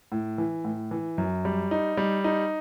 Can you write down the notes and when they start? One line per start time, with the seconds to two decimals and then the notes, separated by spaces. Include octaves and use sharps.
0.12 A2
0.38 E3
0.65 A2
0.91 E3
1.18 F#2
1.45 G3
1.71 D#4
1.97 G3
2.24 D#4